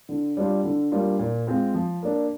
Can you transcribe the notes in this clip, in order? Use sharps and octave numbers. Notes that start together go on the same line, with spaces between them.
D3
G3 D4 F4
D3
G3 A#3 D4 F4
A#2
G#3 C4 F4
F3
A#3 D4